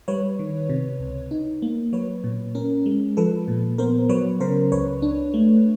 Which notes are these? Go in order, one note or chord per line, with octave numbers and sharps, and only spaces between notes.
G3 B4 C#5
D#3
C3
C#2
D#4
A#3
F#3 B4 C#5
A#2
C#4 A#4
G#3
F3 A4 B4
A#2
B3 A#4 C5
F#3 B4 C#5
C#3 A#4 C5
C#2 B4 C#5
D4
A3